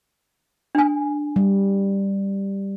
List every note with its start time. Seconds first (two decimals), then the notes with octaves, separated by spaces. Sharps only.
0.75 D4 G#5
1.36 G3